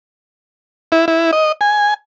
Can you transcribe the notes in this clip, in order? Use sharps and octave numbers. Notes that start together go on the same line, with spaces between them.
E4
E4
D#5
G#5